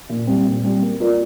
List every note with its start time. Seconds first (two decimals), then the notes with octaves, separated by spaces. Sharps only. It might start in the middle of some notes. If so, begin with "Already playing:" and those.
0.09 A#2
0.27 G3 C4 G4
0.46 A#2
0.63 G3 C4 G4
0.82 A#3
1.00 F4 A#4 D5